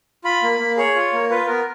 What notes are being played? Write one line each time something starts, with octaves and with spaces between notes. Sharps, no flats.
F4 B5
A#3
A#3
G#4 C#5
F4
A#3
F4 B4
B3 A#4